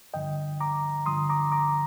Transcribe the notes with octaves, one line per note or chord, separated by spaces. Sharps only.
G2 D3 F3 D#5 G5
A#5 D6
G2 D3 F3 C6 D#6
A#5 D6
A#5 D6